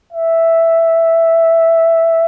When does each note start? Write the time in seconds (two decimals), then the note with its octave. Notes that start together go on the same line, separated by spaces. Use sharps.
0.13 E5